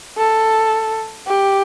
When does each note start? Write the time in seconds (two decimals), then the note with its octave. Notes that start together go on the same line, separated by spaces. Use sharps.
0.17 A4
1.27 G4